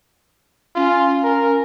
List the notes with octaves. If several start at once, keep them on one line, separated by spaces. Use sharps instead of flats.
C#4 F4
A#4